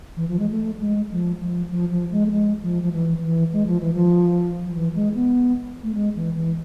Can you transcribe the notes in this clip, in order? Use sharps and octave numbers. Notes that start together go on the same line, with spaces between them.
E3
F3
G#3
A3
G#3
F3
F3
F3
F3
G#3
A3
G#3
F3
F3
E3
E3
G#3
F3
E3
F3
F3
E3
G#3
B3
A3
G#3
E3
E3